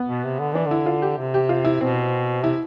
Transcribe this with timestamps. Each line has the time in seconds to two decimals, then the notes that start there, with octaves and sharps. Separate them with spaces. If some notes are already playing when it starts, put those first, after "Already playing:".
Already playing: B3
0.09 B2
0.24 C3
0.40 D3
0.54 E3 D4
0.67 D3 E4
0.86 F4
1.02 G4
1.17 C3
1.34 G4
1.49 F4
1.65 E4
1.81 B2 C4
2.43 C3 E4